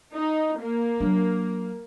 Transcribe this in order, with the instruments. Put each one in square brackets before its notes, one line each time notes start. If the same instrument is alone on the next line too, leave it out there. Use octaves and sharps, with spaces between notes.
[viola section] D#4
A#3
[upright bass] F#3 D4